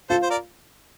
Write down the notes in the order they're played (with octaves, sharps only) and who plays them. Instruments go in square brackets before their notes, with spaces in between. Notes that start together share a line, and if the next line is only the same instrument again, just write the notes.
[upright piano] F4 [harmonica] A4 C5
[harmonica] C5
A#4 D5